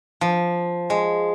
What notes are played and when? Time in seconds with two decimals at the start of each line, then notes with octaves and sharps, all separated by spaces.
0.21 F3
0.90 G#3